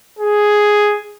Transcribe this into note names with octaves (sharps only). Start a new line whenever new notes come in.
G#4